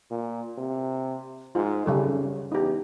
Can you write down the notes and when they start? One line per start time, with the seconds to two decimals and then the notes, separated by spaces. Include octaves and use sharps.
0.11 A#2
0.58 C3
1.55 G#2 F4
1.86 G#1 C#3 G3 A4
2.52 E2 D#4 G4